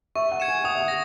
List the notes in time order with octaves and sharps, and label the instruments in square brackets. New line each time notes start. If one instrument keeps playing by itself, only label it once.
[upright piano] E5 [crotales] C#6
[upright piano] F#5
[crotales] G#6 C#7 E7
[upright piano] G#5
[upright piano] F#5 [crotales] D#6
[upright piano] E5
F#5
[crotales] A#6